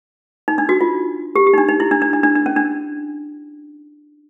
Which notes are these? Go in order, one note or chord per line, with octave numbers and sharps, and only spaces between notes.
D#4
D4
F#4
F4
G4
G4
D#4
D4
D#4
E4
D4
D4
D4
D4
D4
C#4
D4